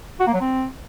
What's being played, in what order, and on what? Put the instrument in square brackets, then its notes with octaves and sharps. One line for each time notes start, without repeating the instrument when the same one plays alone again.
[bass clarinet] F#4
A#3
F#3
C4